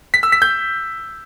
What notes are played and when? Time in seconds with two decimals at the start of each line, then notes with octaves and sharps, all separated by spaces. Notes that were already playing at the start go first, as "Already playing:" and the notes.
0.14 B6
0.23 E6
0.32 B6
0.42 G6